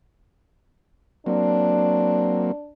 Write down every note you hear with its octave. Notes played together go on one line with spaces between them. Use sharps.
F#3 A#3 C4 D4